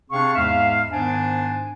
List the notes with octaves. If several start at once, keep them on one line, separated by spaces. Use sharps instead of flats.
C3 C4 D4 G#4 F5 C#6
E2 G#2 G#3 E5 F5
G#2 D#3 B3 D4 C5 G#5